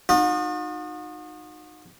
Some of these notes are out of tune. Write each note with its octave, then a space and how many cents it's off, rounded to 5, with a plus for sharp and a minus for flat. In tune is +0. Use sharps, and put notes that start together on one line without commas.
D#4 -25 F#4 -45